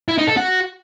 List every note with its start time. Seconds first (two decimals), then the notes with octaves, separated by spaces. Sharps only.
0.08 E4
0.18 D#4
0.27 A4
0.37 F#4